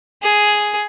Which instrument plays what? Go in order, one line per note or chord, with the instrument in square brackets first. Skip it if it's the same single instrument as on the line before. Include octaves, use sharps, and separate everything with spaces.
[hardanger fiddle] G#4